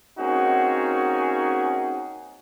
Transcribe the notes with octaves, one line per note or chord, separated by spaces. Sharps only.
A#3 C4 C#4 D#4 F#4 G#4